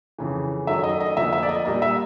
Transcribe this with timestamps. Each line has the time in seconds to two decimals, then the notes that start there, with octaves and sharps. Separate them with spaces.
0.19 F2 C#3 E3
0.67 F#2 D#3 F#3 A3 E5
0.83 D#5
1.00 D#5
1.17 F2 D3 F3 A#3 E5
1.33 E5
1.43 D5
1.49 D#5
1.65 A#2 G3 A#3 D#5
1.82 E5